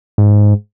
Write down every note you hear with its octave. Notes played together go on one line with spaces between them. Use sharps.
G#2